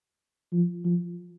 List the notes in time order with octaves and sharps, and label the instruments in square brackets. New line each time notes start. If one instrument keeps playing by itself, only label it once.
[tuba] F3
F3